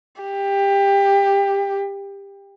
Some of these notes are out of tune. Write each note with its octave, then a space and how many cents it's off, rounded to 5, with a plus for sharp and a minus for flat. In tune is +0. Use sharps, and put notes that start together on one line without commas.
G4 +20